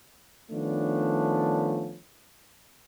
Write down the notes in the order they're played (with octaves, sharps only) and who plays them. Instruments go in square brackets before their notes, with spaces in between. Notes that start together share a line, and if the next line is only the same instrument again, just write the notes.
[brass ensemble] D#3 F3 A3 B3 C#4 D4